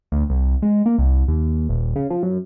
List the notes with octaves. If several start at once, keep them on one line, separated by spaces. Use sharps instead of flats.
D2
C2
G#3
A#3
C2
D#2
D#1
C#3
F3
F#2